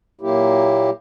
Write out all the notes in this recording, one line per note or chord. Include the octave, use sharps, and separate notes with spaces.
A#2 F#3 A#3 E4 G4